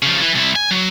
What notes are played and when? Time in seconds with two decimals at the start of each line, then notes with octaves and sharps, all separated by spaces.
0.03 C#3 F3
0.21 E3
0.35 C2 E4
0.56 G#5
0.71 F#3